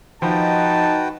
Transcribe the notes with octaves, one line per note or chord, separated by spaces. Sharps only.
F3 D#4 F#4 B4 G5 A5